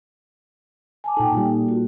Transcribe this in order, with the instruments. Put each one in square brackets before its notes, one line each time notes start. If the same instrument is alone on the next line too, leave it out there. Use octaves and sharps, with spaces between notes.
[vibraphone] G#5 A5 D6
[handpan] A#2 A4 [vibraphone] D#4 G5
[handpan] A#2 G3
[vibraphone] F#4